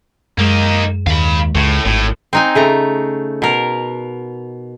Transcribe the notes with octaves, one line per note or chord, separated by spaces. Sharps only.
F#2 G#3 A#3 D#4
D#2 F5 B5
C#2 A2
G#1 A2
C4 D#4 G#5
C#3 A3 A#5
B2 A#4